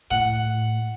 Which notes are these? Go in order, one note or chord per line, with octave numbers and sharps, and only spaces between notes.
A2 F#5